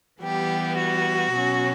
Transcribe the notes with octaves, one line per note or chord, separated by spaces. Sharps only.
E3 G3 B3 G4
F#4
B2 F#3 C#4